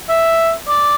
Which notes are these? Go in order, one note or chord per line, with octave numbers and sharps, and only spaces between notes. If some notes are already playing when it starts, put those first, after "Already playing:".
E5
D5